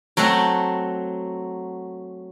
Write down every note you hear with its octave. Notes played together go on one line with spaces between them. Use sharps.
F#3 A3 C4 F#5 A#5